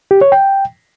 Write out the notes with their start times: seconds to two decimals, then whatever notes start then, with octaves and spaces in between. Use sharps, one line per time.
0.11 G4
0.21 C#5
0.32 G5